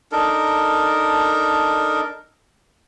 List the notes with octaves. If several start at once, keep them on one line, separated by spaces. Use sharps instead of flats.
D4 D#4 A4 A#4